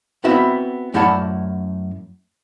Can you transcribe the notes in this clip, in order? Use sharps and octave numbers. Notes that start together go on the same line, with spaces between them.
B3 C4 E4 F#4 E5
F#2 A3 E4 D5 F#5 A5